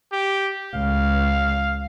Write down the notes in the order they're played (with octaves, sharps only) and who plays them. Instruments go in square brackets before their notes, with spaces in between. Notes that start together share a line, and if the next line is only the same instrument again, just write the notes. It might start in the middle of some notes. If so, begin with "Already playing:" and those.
[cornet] G4
[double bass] C#2 [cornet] F5